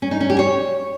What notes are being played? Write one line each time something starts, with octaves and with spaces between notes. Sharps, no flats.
C#4
D#4
C#4
G4
C#5